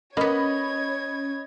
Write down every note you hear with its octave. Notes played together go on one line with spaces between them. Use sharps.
A#3 B3 C#4 C#5 D#5 B5 G#6